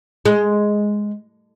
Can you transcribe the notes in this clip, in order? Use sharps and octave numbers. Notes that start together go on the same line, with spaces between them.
G#3